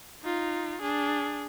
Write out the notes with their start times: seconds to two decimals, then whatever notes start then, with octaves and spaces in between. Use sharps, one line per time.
0.23 D#4 F4
0.82 D4 G#4